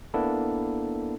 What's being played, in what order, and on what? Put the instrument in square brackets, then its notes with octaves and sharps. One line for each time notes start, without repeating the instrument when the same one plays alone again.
[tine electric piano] A#3 B3 D4 E4 A4